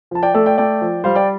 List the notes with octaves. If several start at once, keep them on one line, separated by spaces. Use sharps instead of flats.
F3 A5
D5 G5
A3 A4 D5
D5 G5
A3 D5 G5
F3
G3 C5 F5
D5 G5